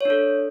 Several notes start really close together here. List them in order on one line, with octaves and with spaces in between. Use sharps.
C#5 D4 A4